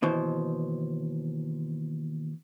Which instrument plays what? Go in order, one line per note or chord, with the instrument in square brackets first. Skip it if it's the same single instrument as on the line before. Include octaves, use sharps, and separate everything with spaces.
[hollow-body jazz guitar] D#2 B2 E3 C5